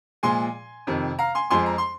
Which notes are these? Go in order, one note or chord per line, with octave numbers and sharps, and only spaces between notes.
A#2 F3 G#3 G#5 C6
F2 C3 D#3
F5 A#5
G#5 C6
F2 F3 G#3 G#5 C6
A#5
C6